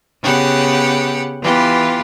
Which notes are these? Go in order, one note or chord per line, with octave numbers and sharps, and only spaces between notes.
C#3 B3 G4 F#5
E3 B3 F4 G4